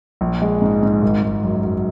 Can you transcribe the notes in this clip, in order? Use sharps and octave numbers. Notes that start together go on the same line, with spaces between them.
A#1
G#3
G#2
G#2
G#1
G#1
F#2
F#2